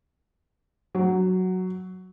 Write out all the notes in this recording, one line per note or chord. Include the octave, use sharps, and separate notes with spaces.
F#3